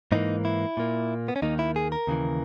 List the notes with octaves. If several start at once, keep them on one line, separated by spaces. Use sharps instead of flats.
G#2 E3 A#3 D#4
E4
A#2 A#3
B3
C#4
D#2 D#3 A#3 D#4
E4
G#4
A#4
D#2 C#3 E3